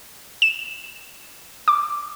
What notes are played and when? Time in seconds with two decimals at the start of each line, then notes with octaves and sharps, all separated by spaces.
0.42 E7
1.68 D6